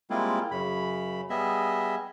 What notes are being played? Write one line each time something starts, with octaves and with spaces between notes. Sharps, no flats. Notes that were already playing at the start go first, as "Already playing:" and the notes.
G3 G#3 A#3 C4 E4 F4
F#2 C#3 B5
G3 B3 G#4 D#5 E5